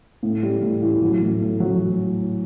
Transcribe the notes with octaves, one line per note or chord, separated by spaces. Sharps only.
A2
G3
A2
E3
F#3
A2
A2
F#3